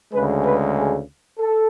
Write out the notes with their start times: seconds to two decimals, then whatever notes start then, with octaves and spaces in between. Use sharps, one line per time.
0.12 D2 C#3 G#3 B4
0.44 B4
0.75 G#4
1.38 A4